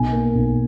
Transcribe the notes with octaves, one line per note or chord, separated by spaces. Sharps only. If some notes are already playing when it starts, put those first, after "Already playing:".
Already playing: B1 G#5
A#3
B1